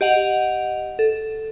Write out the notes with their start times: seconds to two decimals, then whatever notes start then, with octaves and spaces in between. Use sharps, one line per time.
0.01 G4 D#5 F#5 F7
0.99 A4